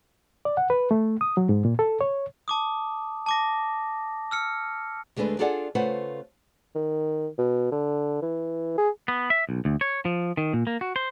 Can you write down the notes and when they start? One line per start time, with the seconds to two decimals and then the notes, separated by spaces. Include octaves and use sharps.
0.45 D5
0.57 F#5
0.70 B4
0.91 A3
1.21 D#6
1.37 F#3
1.49 G#2
1.65 A#2
1.79 A4
2.01 C#5
2.48 A5 D6 D#6
3.26 A5 D6 A#6
4.31 E6 F6 C#7
5.16 D2 G#3 A3 D4 B4
5.39 D4 F4 G#4 A4 D5 F#5
5.75 C#3 A3 F4 B4 C5 F#5
6.75 D#3
7.38 B2
7.72 D3
8.22 E3
8.78 G#4
9.08 B3
9.30 E5
9.49 B1
9.65 D2
9.81 C#5
10.05 F3
10.37 D#3
10.53 A#2
10.67 A#3
10.81 F#4
10.96 C5